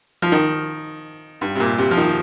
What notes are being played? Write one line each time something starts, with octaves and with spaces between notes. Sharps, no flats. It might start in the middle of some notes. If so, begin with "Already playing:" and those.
F3
D#3
G2
C3
A#2
C3
F3
D#3